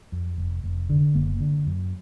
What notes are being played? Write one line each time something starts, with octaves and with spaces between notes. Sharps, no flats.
F2
F1
F1
D3
F#1 A#3
D3
F#2